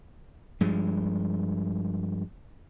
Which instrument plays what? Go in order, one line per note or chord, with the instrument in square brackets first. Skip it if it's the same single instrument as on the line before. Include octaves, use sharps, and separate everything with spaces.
[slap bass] G2 F3 G#3